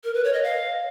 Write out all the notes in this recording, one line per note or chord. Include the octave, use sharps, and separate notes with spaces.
A#4
B4
C#5
D#5
F5